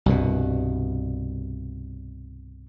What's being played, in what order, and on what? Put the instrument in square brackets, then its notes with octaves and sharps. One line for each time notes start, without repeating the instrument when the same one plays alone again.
[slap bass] C2 G2 B2